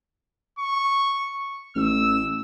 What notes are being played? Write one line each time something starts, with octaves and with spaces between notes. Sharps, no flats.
C#6
A1 E6